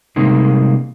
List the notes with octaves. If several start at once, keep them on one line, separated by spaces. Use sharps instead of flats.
C3 G3 G#3 A#3 C4 D#4